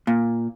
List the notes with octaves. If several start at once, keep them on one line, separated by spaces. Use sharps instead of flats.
A#2